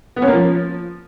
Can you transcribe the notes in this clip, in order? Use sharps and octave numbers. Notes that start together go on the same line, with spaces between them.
B3
C#4
A#3
F3